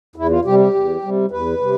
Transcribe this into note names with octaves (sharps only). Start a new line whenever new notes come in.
E2 E4
F4
C3 G3 G4
G4
E2
C3 G3
E2 B4
C3 G3